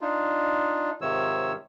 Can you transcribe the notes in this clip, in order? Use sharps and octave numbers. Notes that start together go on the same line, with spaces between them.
D4 D#4 F4
G#2 C3 D#3 F3 C#5 E6